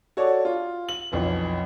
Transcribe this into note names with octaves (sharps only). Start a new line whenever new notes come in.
F#4 A4 C#5 D5
F4
F#7
B1 F2 E3